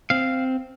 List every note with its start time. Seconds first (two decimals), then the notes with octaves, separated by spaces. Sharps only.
0.10 C4 F5